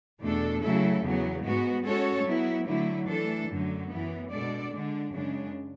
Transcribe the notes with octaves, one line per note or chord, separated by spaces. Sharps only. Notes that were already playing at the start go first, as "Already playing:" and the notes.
E2 B2 A3 D4 A4
C#3 F#3 A3 E4 A4
E2 C#3 F#3 B3
G#2 G#3 B3 F#4
G#3 C#4 F#4 A4 C#5
F#3 B3 E4
D3 F#3 A3 E4
E3 A3 D4 A4
F#2 D3 F#3 A3
F#2 E3 B3
B2 G#3 D4 A4 D5
D3 G#3 D4
F#2 C#3 G#3 D4